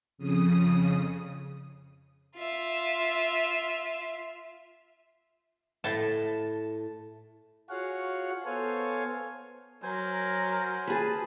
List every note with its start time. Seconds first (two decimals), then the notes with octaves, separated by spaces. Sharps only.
0.18 F2 C#3 D#6
2.37 F4 E5
5.84 A2 A5
7.69 F4 F#4 G#4 C#5 F5 F#5
8.45 B3 A4 C5 C#5 F5 G#5
9.83 F#3 A#4 C5 G#5
10.87 G#4 B4 A5